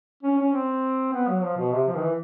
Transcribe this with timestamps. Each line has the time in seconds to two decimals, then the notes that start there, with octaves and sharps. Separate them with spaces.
0.23 C#4
0.39 C#4
0.53 C4
1.13 B3
1.29 F#3
1.43 F3
1.58 B2
1.73 C3
1.88 F3
1.96 D#3
2.02 E3